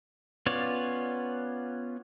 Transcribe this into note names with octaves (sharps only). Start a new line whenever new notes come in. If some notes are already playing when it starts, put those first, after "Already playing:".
B3 C#4 F4 C#5 D5